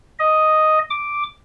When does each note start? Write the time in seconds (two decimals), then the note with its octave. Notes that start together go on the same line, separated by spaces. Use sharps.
0.19 D#5
0.90 D6